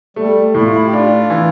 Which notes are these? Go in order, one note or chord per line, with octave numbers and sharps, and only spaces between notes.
G3 A3
A2 E4
F4
E4
G4
D4 F4
E3